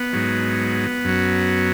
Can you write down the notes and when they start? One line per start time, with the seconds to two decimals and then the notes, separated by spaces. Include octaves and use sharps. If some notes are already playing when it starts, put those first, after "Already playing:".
Already playing: B3
0.13 G#2 F#3
1.05 F#2 F#3